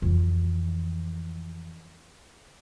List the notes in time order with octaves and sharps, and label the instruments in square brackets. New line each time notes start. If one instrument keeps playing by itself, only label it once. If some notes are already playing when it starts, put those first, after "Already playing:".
[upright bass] F2 E3